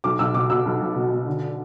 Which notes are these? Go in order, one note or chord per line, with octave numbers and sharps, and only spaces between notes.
B1 D6
B1 E6
B2 D6
B2 E6
B1
B1
B2
B2
D3